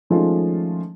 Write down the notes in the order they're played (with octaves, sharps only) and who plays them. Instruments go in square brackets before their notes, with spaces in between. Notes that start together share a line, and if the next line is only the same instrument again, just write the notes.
[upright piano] D#3 F3 G#3 A3 C#4 F4